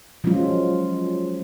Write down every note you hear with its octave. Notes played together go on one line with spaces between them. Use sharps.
F3 F#3 G#3 C#4 F4